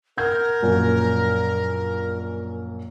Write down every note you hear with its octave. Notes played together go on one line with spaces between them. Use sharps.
A#4 F#5 G6 G#6
A#1 F#2